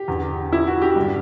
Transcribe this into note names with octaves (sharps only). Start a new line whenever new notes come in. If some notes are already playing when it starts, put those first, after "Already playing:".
Already playing: G4
E2 D3
E4
F#4
G4
G2 D3